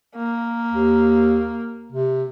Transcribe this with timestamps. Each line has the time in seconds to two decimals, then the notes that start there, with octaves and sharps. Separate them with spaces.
0.16 A#3
0.73 D#2
1.92 C3